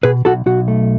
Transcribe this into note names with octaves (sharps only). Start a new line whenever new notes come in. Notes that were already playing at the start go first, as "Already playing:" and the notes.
B2 G#4 B4
B1 F#4 A4
B1 F#4
A3